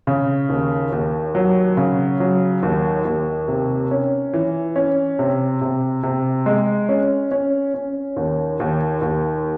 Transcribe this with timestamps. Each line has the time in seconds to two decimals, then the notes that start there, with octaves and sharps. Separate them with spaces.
0.07 C#3
0.49 D#2
0.92 D#2
1.35 F#3
1.77 C#3
2.20 F#3
2.63 D#2
3.05 D#2
3.48 C3
3.91 C#4
4.34 E3
4.76 C#4
5.19 C3
5.61 C3
6.03 C3
6.46 G#3
6.89 C#4
7.31 C#4
7.74 C#4
8.16 D#2
8.60 D#2
9.02 D#2